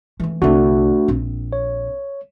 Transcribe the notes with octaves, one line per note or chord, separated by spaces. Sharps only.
E3 A3
C2 D3 A3 D4 F#4
A#1 C4
C#5